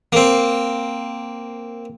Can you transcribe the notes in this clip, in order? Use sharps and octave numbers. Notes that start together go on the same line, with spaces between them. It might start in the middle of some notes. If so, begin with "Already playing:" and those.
A#3 C4